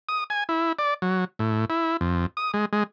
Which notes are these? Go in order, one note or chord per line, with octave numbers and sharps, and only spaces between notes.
D#6
G#5
E4
D5
F#3
A2
E4
F2
D#6
G#3
G#3